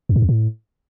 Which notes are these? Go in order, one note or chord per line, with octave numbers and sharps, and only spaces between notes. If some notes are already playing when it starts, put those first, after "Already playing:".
F2
G#2
E2
A2